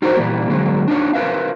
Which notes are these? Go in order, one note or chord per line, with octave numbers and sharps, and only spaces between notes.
D#4 F4 F#4 A#4 C5 C#5
A#2 E3 G3 A#3
D3 F#3 G#3 A#3
D4 D#4 F4 C#5
F4 A#4 B4 E5 F5